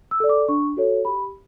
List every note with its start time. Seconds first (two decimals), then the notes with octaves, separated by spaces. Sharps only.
0.11 E6
0.20 A4 D5
0.29 D6
0.49 D4 C#6
0.77 F#4 A4 C#5
1.05 G4 B5